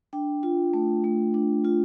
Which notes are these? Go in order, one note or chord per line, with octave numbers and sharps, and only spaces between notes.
D4 G5
F4
A3
A3
D4
F4